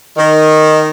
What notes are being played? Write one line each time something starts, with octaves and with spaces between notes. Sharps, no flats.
D#3